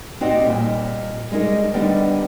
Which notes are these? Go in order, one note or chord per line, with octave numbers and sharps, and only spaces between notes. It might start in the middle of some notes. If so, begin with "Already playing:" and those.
C4 D#4 F#4 G4 C5 D5
D#2 A#2 G3
G3 G#3 B3 D#4 A#4
D3 D#3 G3 B3 D4 D#4